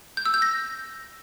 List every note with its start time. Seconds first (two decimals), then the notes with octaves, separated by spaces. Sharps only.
0.17 G6
0.26 E6
0.34 G6
0.42 A#6